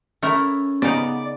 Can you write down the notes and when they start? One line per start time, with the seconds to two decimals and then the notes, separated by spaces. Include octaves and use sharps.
0.23 A3 C#4 E4 A#4
0.82 C#3 B3 D#4 D5